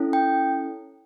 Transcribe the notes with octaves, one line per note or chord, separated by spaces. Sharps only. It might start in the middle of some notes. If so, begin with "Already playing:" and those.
Already playing: C#4 E4 A4
G5